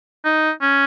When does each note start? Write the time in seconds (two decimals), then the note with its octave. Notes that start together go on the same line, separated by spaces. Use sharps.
0.25 D#4
0.62 C#4